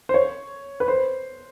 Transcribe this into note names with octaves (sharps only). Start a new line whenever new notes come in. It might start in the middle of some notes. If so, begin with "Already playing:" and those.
C5
C#5
B4
C5